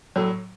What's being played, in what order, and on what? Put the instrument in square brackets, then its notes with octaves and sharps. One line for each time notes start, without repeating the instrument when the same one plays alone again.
[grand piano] A2 F#3